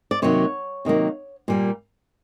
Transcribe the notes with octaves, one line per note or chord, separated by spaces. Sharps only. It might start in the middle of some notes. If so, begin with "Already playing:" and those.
D5
C3 D#3 F#3 A#3 C#5
C3 D#3 F#3 A#3
A#2 G3 A#3